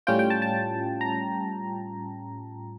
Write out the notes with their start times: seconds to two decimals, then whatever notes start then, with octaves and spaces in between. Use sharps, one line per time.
0.07 A2 G3 C#4 F4 G5
0.19 G5
0.30 A5
0.42 A5
1.01 A#5